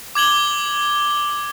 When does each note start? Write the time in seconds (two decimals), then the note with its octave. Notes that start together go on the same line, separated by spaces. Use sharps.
0.15 D6 G#6 F#7 G7